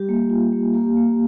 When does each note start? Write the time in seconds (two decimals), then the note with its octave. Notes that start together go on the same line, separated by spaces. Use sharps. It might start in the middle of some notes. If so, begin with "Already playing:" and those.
Already playing: G3 G4
0.09 A#3
0.30 F4
0.52 A#3
0.74 A#3 G4
0.97 A#3